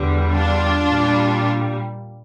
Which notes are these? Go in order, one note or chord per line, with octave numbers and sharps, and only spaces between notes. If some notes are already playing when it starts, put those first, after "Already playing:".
Already playing: E2 D3 G3
D4 F4
A#2 G3